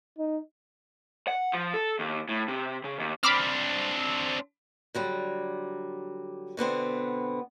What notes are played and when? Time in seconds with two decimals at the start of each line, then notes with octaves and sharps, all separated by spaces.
0.18 D#4
1.28 F#5
1.53 F3
1.74 A4
1.99 D#2
2.29 A2
2.48 C3
2.84 C#3
2.99 D#2
3.23 C4 D4 B5 D6 F6
4.95 D3 F#3 G3
6.57 B2 D3 B3 C4